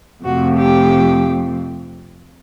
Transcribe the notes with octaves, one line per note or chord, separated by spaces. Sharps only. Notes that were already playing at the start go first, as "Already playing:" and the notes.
F2 C3 F3 A3 F#4
G4